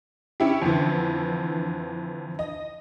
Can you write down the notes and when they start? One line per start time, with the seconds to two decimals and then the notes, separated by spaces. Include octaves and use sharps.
0.40 C#4 E4 G4
0.62 F2 D3 E3
2.39 D#5